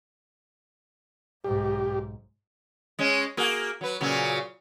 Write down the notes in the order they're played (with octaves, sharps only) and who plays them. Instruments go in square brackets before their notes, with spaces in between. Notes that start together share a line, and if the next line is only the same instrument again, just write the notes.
[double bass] B1 G#2 [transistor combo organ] G4
[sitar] G#3 C#4
A#3 F#4 G#4
F#3 B4
A#2 C#3 F#3